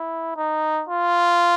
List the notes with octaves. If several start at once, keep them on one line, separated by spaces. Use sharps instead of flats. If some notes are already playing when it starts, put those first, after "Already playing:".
Already playing: E4
D#4
F4